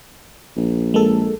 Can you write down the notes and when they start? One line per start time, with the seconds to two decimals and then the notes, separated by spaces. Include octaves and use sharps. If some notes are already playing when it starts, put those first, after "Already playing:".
0.57 A#1
0.94 G#3 A#3 A4